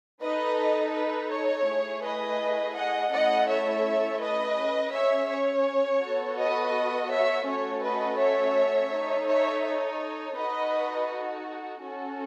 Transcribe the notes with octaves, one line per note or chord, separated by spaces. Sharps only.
D#4 A4 B4 D#5
B4
C#5
A3 E4 G#4
B4 D#5
D#5 F#5
A3 C#4 E4 A4 D#5 F#5
C#5 E5
B4 D#5
C#4 G#4
C#5 E5
C#5
B3 F#4 A4
B4 D#5
C#5 E5
A3 C#4 F#4 A4 C#5
B4 D#5
C#5 E5
D#4 A4
C#5 E5
C#5
D#4 F#4 A4 B4 D#5
C#4 F#4 A4